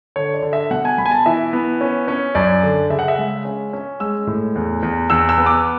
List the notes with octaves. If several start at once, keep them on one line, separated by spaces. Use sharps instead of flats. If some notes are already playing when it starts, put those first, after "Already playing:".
D3 C#5
D5
D3
E5
B2 F#5
G#5
B2 B5
G#5
A5
E3 E5
B3
C#4
C#4
F#2 D5
D3
C#3 E5
F#5
E5
G#3
C#4
C#4
G#3 E6
A2
E2
E2
E2 E6
E6
B3
D6